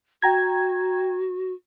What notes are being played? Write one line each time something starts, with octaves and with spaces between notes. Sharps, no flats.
F#4 G5 A#5 G#6